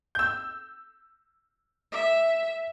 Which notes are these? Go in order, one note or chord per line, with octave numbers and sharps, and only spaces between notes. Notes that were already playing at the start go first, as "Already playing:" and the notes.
E6 G6
E5